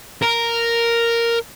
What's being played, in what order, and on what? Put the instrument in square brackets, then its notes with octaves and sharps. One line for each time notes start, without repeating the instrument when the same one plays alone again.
[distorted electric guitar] A#4